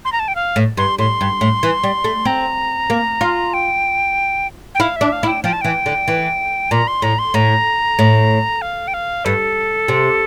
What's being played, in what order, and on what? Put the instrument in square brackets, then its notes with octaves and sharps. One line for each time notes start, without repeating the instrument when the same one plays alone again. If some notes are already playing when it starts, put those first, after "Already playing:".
[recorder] C6
A#5
A5
G5
F5
[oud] A2
[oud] G2 [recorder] C6
[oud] A2 [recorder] C6
[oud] G2
A2
E3
G3
A3
[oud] C4 [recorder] A#5
[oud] A#3
F4
[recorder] G5
G5
[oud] E4 [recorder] F5
[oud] D4 [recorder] E5
[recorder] F5
[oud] E4
[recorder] G5
[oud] F3 [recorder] G5
[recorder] A5
[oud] E3 [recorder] G5
[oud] D3
E3
[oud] A#2 [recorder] A#5
[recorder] C6
[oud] A2 [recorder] A#5
[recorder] C6
[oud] A2 [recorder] A#5
[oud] A2
[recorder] F5
G5
F5
[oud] G2 [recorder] A4
[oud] C3